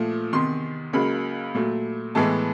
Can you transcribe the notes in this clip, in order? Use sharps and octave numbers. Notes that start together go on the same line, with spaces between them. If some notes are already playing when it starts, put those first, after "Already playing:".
Already playing: A#2 F3 A3
E2 C3 D#3 C6
C#2 C#3 F#3 A#3 B5
A#2 F#3 A3
A2 E3 G#3 B3 A5